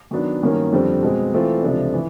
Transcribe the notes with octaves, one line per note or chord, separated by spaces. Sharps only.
D#3 F#3 B3 D4
G2 D#3 F#3 A#3 C#4
F2 D3 G3 C4
B2 G#3 C4
E3 A3 C4 F4
C#2 C3 F3 A3 D4
E3